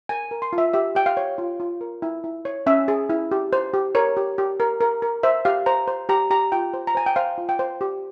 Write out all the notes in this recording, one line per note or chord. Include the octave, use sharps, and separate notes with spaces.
A#4 G#5
A#4
C6
F4
E5
G4 E5
G4 G5
F5
C#5
F4
F4
A#4
E4
E4
C#5
C#4 E5
G#4
E4
G4
C5
G4
A#4 C#5
G4
G4
A#4
A#4
A#4
C5 E5
G4 F5
C5 A#5
C5
G4 A#5
G4 A#5
F4 G5
C5
A#5
C5 G#5
G5
C5 F5
F4
G5
C5
G4